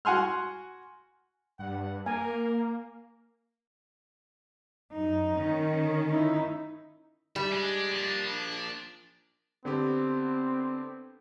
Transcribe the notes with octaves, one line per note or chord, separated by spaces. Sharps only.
F#4 F#5 G#5 C6 F6
G2 F#5
A#3 A#4 G#5
F#2 D#4
D#3 C#4
D#4 E4
G3 E5
G#3 D4 D5
F3 A#3
D3 B3 C4 G4